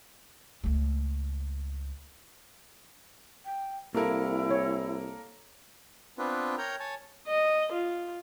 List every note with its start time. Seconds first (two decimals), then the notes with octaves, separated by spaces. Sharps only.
0.64 C#2 A3
3.45 G5
3.94 C2 A#3 E4 A4 A#4
4.51 C#5
6.18 B3 C4 D4 F4 B4
6.58 A#4 C#5 G5 A#5
6.80 C#5 G#5 A5
7.27 D#5
7.72 F4